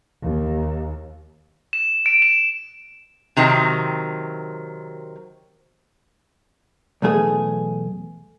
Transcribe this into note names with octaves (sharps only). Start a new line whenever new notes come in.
D#2
E7
D7
E7
C3 D#3 F#3 C4
B1 E2 A3 G#4